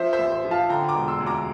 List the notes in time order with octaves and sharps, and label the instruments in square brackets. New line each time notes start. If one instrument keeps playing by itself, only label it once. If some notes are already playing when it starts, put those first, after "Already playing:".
Already playing: [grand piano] F3 C5 E5
C5 E5
A1
C5
F3
F5 A5
D3 G5 A#5
A#5 D6
E1
C6 E6
D2
A#5 D6